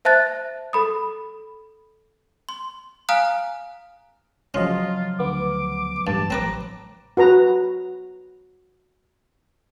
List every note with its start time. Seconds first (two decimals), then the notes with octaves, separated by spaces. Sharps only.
0.05 C5 E5 A5 F#6 A6
0.73 A4 B5 D#6
2.49 C6
3.09 F5 G#5 A#5 D#6 F6 F#6
4.54 C#3 F3 F#3 C#4 F4 D#5 C6
5.19 D2 B3 D6
6.07 A1 G2 A5
6.30 C4 B4 A#5 D6
7.17 F#4 B4 A#5